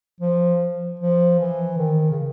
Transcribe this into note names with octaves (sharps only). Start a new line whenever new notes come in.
F3
F3
E3
D#3
C#3